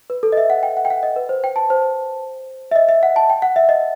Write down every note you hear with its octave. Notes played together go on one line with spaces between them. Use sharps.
B4
A4
D#5
E5
F#5
G5
F#5
G5
F#5
D#5
B4
C5
G5
A5
C5
E5
D#5
E5
F#5
A5
G5
F#5
E5
D#5